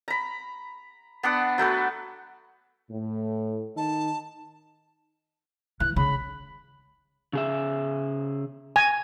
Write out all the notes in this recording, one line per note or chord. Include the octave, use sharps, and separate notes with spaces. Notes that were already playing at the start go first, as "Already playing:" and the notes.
A#5 B5
B3 D4 F#5
F#3 A3 F#4 B4
A2
D#3 D#4 A5
E3 F#6
C#3 B5
C#3 G#4 E5
G#5